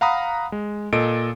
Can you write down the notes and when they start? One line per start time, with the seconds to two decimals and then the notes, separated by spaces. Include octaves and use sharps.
0.01 F5 F#5 A#5 B5 D#6
0.52 G#3
0.93 A#2 A4 D#5 D7